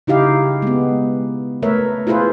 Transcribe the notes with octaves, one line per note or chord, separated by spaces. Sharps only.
C#3 D#4 E4 G4 F5
G#3 B3
A3 A#4 B4 C#5 E5
E4 F4 G#4 B4 C5